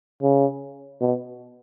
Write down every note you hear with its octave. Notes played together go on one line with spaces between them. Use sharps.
C#3
B2